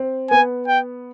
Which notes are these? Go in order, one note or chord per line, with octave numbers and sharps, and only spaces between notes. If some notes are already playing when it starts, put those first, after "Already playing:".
Already playing: C4
B3 G#5
G5